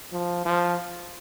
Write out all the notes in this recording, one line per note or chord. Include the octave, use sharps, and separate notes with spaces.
F3
F3